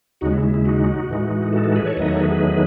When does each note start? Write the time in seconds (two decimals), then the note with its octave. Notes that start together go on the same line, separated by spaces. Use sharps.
0.21 D#2 C#3 G#3 D#4 F#4
0.33 E4
0.43 E4
0.54 E4
0.65 D#4 F#4
1.09 A2 E3 G#3 D#4
1.53 F#4 A4
1.64 F#4 A4
1.75 G#4 B4
1.86 A4 C#5
1.97 E2 D#3 F#3 A3 D#4 B4 D#5
2.09 A4 C#5
2.19 G#4 B4
2.30 G#4 B4